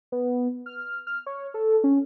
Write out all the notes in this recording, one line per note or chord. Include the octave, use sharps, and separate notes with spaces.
B3
F6
F6
C#5
A4
C#4